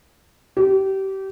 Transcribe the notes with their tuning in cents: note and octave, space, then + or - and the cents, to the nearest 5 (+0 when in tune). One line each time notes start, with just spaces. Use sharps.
G4 -25